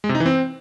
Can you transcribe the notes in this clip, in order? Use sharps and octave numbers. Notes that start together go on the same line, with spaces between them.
G#3
C3
D#4
E3
C4